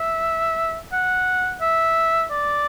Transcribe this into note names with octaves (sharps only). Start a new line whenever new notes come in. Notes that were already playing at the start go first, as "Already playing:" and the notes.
Already playing: E5
F#5
E5
D5